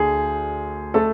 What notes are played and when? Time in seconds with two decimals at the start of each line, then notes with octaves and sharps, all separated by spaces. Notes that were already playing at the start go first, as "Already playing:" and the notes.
Already playing: D2 D3 G#4
0.94 A3 A4